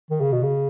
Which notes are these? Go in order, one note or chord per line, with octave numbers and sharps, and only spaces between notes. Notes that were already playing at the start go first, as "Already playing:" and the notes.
D#3
C#3
B2
C#3